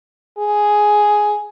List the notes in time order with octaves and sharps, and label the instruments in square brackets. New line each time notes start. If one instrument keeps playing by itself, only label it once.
[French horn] G#4